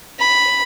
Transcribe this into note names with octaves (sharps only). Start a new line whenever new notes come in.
B5